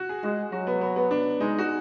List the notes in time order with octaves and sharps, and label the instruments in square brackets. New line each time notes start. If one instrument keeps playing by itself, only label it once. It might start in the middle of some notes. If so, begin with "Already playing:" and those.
Already playing: [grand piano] F#4
G#4
[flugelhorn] G#3 [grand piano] F#4
[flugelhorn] F#3 [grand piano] F#4
[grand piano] B3
B3
B3
D4
[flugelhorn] G#3 [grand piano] D#4
[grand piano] F#4